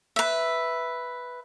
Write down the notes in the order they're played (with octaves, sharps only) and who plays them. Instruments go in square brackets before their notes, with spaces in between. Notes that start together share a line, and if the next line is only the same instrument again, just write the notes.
[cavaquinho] B4 E5